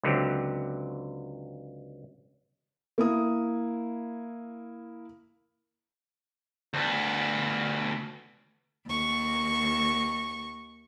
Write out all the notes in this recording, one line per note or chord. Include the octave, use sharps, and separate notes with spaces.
C#2 D3 F#3 C4 G4
A#3 E4 D#6
D2 B3
D#2 C#6